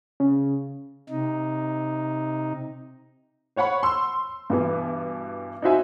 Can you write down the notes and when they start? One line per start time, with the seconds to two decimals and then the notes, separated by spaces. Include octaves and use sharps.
0.20 C#3
1.09 C3 D#4
3.56 C5 C#5 F#5 B5 C#6
3.83 C6 E6
4.50 G2 B2 E3
5.62 D#4 E4 F#4 C5 E5 G#5